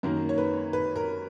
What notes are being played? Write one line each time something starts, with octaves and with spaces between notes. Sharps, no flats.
F#2 D#3 A#3 A#4
C#5
B4
B4
A#4